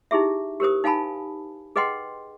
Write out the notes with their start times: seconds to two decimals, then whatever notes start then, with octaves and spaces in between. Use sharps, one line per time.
0.11 D#4 E4 G4 G#4 E5
0.60 G4 A#4 C5 D#6
0.84 D#4 F5 G#5 A5 B5
1.76 G#4 B4 D#5 F#5 G5 C6